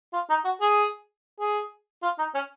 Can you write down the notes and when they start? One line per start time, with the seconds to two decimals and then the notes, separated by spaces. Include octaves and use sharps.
0.13 F4
0.30 D#4
0.45 F#4
0.61 G#4
1.40 G#4
2.03 F4
2.19 D#4
2.34 C#4